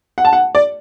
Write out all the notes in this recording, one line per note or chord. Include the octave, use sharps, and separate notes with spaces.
F#5
A5
F#5
D5